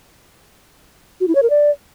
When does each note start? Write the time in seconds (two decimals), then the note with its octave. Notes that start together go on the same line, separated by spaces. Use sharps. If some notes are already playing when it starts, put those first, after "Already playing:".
1.21 F#4
1.28 E4
1.35 C#5
1.43 A#4
1.50 D5